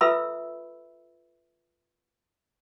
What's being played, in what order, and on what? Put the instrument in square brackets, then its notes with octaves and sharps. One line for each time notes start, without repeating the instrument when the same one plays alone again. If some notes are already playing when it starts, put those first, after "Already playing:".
[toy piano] F4 A4 B4 E5 B5 E6